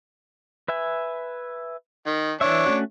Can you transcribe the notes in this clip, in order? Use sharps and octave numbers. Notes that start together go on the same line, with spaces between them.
B4 E5 G#5
D#3
E3 D4 C#5 E5
A3 C#4 F#4